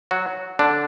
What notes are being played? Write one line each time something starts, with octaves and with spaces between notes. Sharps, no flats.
F#3 F#4
D3 D4